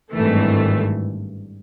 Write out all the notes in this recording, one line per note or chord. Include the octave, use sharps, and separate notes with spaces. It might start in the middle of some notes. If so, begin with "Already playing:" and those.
G#1 G2 E3 A3